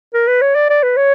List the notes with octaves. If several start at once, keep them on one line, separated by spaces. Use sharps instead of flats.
A#4
B4
C#5
D5
D5
B4
C#5